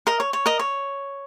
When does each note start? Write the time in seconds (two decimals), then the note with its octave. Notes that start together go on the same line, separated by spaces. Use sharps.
0.07 A#4 D#5
0.20 C#5
0.33 C#5
0.46 A#4 D#5
0.59 C#5